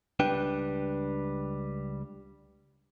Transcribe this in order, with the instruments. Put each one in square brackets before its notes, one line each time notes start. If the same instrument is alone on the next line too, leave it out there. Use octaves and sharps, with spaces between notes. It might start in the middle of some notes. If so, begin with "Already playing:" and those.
[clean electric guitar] C#2 G3 D4 B4 G5